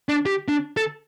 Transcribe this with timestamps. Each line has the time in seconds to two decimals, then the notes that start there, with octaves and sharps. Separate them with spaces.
0.09 D4
0.26 G4
0.48 D4
0.77 A4